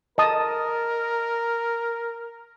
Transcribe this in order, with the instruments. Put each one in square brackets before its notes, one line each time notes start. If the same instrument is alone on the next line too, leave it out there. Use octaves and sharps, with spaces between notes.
[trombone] A#4 [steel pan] D#5 A5 D#6